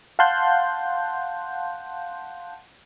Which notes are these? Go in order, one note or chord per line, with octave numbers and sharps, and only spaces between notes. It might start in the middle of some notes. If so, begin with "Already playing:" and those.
F5 F#5 A5 C6 F#6 G6